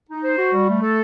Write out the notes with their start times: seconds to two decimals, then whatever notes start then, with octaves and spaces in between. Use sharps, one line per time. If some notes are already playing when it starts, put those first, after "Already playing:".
0.09 D#4
0.24 C5
0.38 F#4
0.53 G3
0.68 A3
0.82 A4